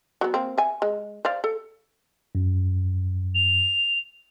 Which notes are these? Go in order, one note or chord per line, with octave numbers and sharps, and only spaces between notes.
F#3 B3
A#3 C4
E5 G#5
G#3
C5 D5 F5
A4
F#2
F7